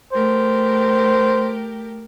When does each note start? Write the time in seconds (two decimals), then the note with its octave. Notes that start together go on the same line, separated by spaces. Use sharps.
0.13 A3 G4 A#4 C5